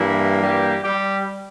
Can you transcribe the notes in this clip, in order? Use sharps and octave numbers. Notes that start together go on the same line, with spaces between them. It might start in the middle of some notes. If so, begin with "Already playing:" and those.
Already playing: G2 E3 G3 A#3 E4
G3 G4
G3 G4